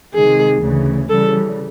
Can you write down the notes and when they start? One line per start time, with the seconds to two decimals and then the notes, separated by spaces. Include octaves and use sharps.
0.14 C3 D#3 G#3 G#4
0.62 D2 C#3 E3
1.10 C#3 E3 G3 A4